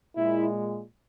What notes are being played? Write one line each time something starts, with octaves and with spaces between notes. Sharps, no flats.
A#2 G#3 E4